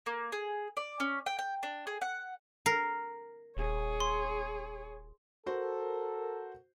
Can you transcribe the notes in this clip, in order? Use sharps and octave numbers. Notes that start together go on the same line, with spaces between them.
A#3
G#4
D5
C#4
G5
G5
D4
G#4
F#5
A#4 C7
D#1 G#4 C#5
C6
F#4 A4 A#4 C5